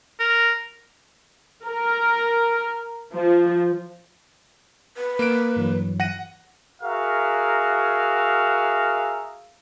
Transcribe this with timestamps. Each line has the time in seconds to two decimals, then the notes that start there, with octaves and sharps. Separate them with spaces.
0.20 A#4
1.64 A#4
3.13 F3
4.97 B4
5.19 A#3 D7
5.56 G2 E3 F#3
6.00 F#5 A#6 D#7
6.82 F#4 G#4 A#4 E5 F5